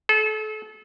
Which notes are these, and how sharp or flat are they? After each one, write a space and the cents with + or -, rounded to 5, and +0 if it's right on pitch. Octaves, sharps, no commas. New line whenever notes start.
A4 -35